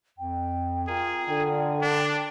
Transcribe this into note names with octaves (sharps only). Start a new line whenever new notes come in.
F2 G5
F4 G#4 A#4
D3
D4